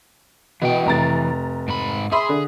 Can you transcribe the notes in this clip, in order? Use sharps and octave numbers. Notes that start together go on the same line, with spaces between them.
B2 E3 G5
F1 A#5 A6
G#2 B5
G#4 E5 B5 C6
D3